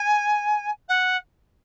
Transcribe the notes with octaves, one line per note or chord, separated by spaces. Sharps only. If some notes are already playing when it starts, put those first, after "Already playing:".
Already playing: G#5
F#5